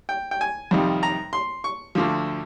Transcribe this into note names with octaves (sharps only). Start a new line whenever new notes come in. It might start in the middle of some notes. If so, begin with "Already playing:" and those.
G5
G5
G#5
F2 C3 D#3 G3
A#5
C6
C#6
D2 D3 F3